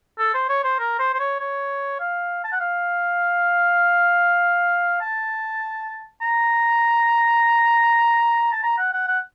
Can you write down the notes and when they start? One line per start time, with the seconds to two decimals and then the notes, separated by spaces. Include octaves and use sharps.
0.19 A4
0.34 C5
0.49 C#5
0.64 C5
0.79 A#4
0.99 C5
1.14 C5
1.19 C#5
1.40 C#5
2.00 F5
2.44 A5
2.52 F#5
2.60 F5
5.01 A5
6.22 A#5
8.52 A5
8.63 A#5
8.78 F#5
8.93 F#5
9.08 F#5